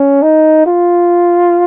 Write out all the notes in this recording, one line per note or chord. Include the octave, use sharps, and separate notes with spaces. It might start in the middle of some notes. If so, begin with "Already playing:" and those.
Already playing: C#4
D#4
F4